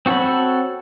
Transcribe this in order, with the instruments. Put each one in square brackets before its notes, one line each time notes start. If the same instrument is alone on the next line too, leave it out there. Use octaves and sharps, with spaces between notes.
[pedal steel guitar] C4 F#4 A4 C#5 B5